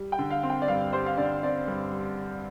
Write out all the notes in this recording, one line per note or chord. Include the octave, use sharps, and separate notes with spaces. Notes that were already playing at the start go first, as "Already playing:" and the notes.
Already playing: G3
G5
D3
F5
C4
G5
D5
G2 F5
G3 C5
F5
D3 D5
C4 D5
G2
G3